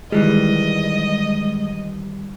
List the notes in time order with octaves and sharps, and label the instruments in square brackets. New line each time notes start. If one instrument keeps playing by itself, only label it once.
[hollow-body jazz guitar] D#3 E3 G3 [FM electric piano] G#3 [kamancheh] D#5